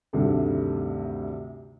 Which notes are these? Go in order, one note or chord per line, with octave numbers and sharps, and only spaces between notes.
D2 G2 C3 D#3 A3